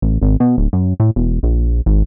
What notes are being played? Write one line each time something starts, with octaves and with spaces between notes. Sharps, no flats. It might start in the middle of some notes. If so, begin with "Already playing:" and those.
A1
G#1
B2
D1
F#2
A2
E1
A#1
G#1